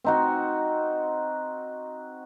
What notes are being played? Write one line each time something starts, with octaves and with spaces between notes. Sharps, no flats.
C4 D#4 F#4